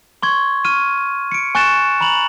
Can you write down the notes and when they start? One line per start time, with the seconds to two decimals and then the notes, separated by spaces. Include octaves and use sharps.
0.23 C6 C#6 G#6
0.65 C#6 F6 D#7
1.32 C#7 D7
1.55 G#5 C#6 F#6 A6 C#7 E7
2.00 A#5 B5 F7 F#7